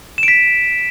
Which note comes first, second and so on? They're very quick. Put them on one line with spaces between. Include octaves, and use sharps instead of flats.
E7 D7 B6